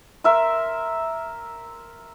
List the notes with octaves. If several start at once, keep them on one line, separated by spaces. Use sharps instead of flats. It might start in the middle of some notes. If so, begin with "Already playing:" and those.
A#4 E5 C6